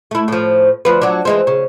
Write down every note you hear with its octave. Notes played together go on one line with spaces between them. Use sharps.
A3 E4
A2 F3
D2 F3 B4
F#3 D4
E3 G#3 C4
C#3